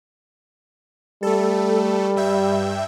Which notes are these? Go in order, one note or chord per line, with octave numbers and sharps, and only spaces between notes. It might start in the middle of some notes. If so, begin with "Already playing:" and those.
G3 A3 A4
G2 E5 G5